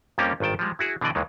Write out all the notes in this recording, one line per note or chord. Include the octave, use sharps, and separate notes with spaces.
F2 F3 G3 A#3 C#4 G4
G#1 G2 D#3 G5 A5
F3 G3 G#3
E4 F#4 G#4
B2 D3 E3 D5 D#5
D#2 D#3 E3 G#3